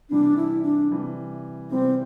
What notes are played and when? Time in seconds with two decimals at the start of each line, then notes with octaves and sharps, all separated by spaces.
0.10 C3 E3 G3 D4
0.37 E4
0.63 D4
0.90 C3 E3 G3
1.70 C3 E3 G3 C4